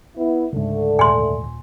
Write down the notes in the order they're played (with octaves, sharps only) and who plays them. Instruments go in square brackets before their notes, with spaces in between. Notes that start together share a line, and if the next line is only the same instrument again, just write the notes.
[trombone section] B3 E4
[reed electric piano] C#2 G#2 [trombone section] D3 A3
[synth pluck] D#2 A#2 [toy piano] G#5 C6